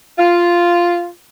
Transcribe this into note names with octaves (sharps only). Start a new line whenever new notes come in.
F4